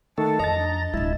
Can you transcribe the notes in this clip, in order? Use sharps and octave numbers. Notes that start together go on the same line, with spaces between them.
D#3 A3 A4 A5
F2 D#5 A#5 A6
D4
D1 G#3 E4